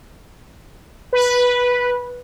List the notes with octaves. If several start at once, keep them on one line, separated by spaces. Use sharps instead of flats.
B4